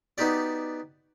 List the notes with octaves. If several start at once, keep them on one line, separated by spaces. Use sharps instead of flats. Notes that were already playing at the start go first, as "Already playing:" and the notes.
B3 D#4 F#4 G4 D5